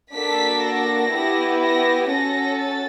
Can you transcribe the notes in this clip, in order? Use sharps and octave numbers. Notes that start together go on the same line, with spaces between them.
A#3 D4 F#4 A4 B6
A#6
B3 E4 G4
A#6
C#4 F#4 A4 A#6
A6